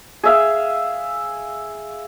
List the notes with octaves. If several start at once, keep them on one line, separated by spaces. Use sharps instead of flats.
G#4 E5 F5